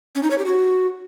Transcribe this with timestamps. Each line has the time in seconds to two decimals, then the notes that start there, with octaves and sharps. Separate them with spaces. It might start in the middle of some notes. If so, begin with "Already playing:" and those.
0.15 C#4
0.23 D#4
0.31 C#5
0.38 G4
0.46 F#4